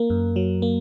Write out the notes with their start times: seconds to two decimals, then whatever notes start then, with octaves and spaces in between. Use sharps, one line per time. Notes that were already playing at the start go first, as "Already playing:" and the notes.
Already playing: A#3 A#4
0.10 F#2
0.36 F#3
0.62 A#3